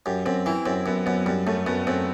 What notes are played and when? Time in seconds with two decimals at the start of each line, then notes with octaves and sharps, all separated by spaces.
0.06 F#2 G4
0.26 F#2 C4
0.46 E3 E4
0.65 F#2 C4
0.86 F#2 B3
1.06 F#2 B3
1.26 F#2 G3
1.47 F#2 A3
1.66 F#2 B3
1.87 F#2 C4